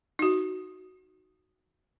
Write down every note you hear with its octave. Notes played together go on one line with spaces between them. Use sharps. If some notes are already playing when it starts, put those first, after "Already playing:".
D#4 F#4